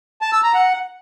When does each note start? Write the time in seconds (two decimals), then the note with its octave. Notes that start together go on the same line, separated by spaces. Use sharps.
0.22 A5
0.32 E6
0.43 A#5
0.54 F#5